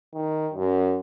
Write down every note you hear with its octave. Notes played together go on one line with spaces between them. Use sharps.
D#3
F#2